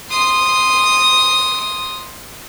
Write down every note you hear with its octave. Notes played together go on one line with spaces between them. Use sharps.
C6 D#6